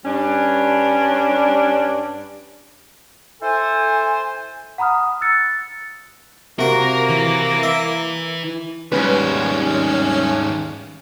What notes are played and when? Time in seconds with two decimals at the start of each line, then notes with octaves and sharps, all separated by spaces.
0.06 G2 G3 C#4 D4
3.42 E4 A4 C5 G#5
4.78 F#5 A#5 B5 D#6 F6
5.21 E6 F#6 A6 C#7
6.59 C3 A#3 F#4 A#4
7.10 E3
7.63 E5
8.92 D#2 G#2 G3 C#4 B4